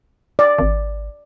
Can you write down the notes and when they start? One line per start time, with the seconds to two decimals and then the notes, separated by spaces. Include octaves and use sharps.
0.39 D5
0.59 G#1